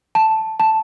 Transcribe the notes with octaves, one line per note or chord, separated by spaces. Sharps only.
A5
A5